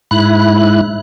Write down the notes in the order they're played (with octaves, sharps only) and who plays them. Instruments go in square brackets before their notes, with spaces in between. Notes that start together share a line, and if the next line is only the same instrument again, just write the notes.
[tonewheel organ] G#2 E4 F#6